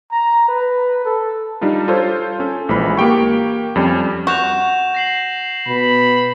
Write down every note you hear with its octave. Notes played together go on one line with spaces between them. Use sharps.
A#5
B4
A4
G3 D4 D#4 F4
F4 A4 C5 C#5
C#4 A4
A#1 E3 F3 G#3 B5
A#3 G4 G5 C#6
F2 G3 C#4
F#4 G6 E7 F7
A#6 C7 F#7
B2 B5